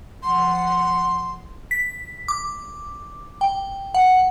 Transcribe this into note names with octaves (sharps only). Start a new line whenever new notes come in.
F3 F#5 C6
B6
D6
G5
F#5